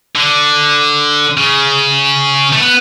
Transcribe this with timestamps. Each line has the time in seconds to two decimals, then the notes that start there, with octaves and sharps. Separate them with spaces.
0.15 D3
1.38 C#3
2.53 A3
2.59 B3